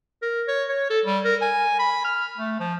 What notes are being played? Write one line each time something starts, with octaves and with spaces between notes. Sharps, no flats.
A#4
C#5
C#5
A4
G3
A#4
G#5
B5
F6
A3
F3